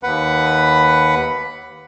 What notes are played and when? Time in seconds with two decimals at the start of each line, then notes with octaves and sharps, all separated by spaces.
0.03 D#2 B4 F#5 B5